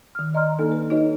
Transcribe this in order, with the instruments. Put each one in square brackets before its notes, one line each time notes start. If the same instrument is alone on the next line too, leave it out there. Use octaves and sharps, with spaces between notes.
[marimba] D#3 F6
D5 D#5 A#5 C6 F6
A#3 D4 D#4 A4
B4
D#4 F#4 C#5 D#5